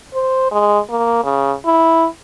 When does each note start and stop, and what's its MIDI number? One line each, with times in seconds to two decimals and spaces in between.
0.14 0.51 72
0.51 0.79 56
0.90 1.20 58
1.23 1.54 49
1.65 2.06 64